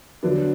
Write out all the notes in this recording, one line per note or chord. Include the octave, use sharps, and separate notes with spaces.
D3 F#3 B3 D4